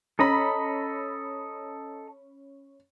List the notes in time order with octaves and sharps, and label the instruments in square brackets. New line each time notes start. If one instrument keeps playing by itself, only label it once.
[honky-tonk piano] C#4 B5 [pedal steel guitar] A4 D#5 A#5